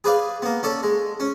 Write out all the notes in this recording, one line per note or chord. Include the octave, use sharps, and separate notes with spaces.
G#4 B4 D5 F5
A#3 B3
C#4 A4 D5
G#3
C#4